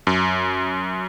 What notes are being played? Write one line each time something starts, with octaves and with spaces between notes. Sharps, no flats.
F#2